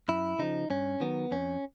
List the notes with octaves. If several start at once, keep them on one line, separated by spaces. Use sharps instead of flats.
F#2 E4
C#3 F3 D#4
G2 C#4
D#3 F#3 B3
F2 C#4